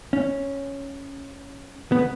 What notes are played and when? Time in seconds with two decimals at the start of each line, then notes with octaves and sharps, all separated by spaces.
0.13 C#4
1.92 B3